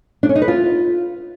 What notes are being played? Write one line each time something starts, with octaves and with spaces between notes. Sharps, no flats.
D4
C#4
D#4
B4
F4